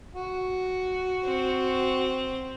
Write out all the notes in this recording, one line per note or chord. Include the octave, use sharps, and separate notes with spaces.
F#4
C4